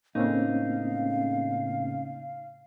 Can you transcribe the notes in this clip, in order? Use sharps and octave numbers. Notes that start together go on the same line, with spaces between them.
A2 C#3 A#3 C4 C#4 D#4 F5